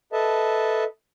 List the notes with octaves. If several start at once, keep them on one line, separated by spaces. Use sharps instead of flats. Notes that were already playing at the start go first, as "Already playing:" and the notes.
A4 B4 D#5 E5 A5